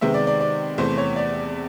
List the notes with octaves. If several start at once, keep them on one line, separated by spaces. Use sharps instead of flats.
C3 D#3 G#3 B3 E5
D5
D5
D5
E2 C3 E3 A3 C5
C#5
D5